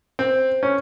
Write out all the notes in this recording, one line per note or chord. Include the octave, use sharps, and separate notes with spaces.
C4
C#4